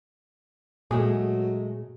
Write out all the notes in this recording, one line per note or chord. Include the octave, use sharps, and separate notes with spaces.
A#2 F#3 G#3 A3 G#4 C#5